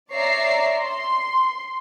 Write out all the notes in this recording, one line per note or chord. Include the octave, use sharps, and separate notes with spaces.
C#5 D5 E5 A#5 C7
C6